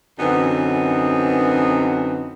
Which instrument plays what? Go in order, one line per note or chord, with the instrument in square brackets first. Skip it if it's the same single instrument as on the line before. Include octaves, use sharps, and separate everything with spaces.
[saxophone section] F#2 D3 E3 B3 C4 D#4